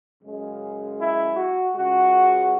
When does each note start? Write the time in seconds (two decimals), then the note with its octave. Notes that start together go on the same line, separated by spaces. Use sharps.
0.23 F#2 C#3 G#3
0.99 E4
1.36 F#4
1.74 C#2 C#3 G#3 F#4